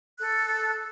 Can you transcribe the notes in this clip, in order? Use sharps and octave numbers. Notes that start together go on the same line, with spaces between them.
A4 F#6